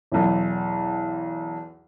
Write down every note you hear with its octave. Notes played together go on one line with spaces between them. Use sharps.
B1 E2